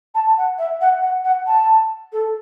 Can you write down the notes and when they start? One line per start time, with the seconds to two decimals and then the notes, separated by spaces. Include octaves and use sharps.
0.14 A5
0.37 F#5
0.58 E5
0.81 F#5
1.02 F#5
1.24 F#5
1.46 A5
2.12 A4